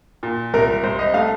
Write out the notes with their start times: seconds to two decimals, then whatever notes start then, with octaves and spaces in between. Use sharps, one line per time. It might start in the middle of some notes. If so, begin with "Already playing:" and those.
0.23 A#2
0.54 C2 A#4
0.83 C2 C5
0.99 D#5
1.14 A3 F5